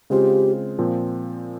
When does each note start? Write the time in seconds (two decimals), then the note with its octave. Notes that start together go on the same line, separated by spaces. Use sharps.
0.10 C#3 G#3 C4 F4 G4 C5
0.79 A#2 F3 C4